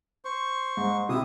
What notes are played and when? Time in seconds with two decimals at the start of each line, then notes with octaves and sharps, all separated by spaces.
0.25 C5 C#6
0.77 G#2
1.09 C3 E4 D#6